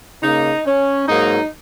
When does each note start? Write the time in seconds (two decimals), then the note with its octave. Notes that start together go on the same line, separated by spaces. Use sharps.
0.23 C#3 A#3 D#4
0.66 C#4
1.08 G#2 F#3 A#3 D#4